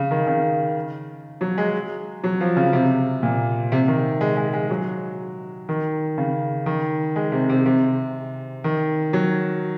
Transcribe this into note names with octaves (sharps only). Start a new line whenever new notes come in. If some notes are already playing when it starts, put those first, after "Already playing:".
Already playing: C#3
D#3
C#3
F#3
G#3
F#3
F3
C#3
C3
A#2
C3
D#3
G#3
G#3
G#3
F#3
D#3
C#3
D#3
G#3
C3
C3
C3
D#3
F#3